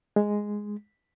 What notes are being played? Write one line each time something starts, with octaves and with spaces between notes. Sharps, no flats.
G#3